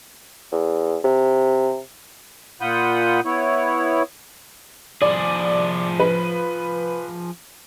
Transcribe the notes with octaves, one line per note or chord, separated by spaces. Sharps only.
E2
C3
A#2 F4 F#5 B5 D#6 G6
B3 E4 C#5
F3 G#4 D5
B4